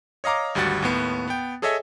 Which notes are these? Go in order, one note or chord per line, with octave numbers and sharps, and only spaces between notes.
C#5 D#5 F5 A#5 D6
G#1 D2 G3 F#4 F#5 A6
D#2 A2 B3
B3 G5
G#4 A4 C#5 D#5 E5 G#5